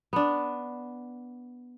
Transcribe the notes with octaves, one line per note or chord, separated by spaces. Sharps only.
B3 D4